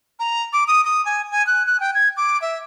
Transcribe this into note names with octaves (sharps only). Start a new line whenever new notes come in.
A#5
D6
D#6
D#6
G#5
G#5
F#6
F#6
G5
G#6
D6
E5